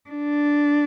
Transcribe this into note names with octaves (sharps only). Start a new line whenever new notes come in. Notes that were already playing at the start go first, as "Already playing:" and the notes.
D4